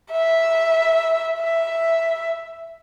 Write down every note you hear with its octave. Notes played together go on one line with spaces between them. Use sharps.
E5
E5